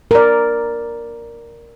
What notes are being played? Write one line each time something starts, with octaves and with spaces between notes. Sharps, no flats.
A#4 D5